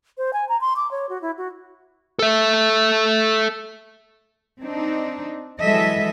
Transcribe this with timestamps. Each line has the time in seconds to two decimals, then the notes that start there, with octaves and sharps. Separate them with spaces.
0.18 C5
0.33 G#5
0.49 A#5
0.61 C6
0.76 D6
0.91 C#5
1.09 F#4
1.22 E4
1.38 F#4
2.19 A4 E5
4.61 C4 D4 D#4
5.60 E3 F#3 G#3 A4 D#5 E5